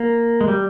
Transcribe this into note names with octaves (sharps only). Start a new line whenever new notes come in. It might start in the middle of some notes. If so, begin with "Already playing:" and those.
Already playing: A#3
G#3
G3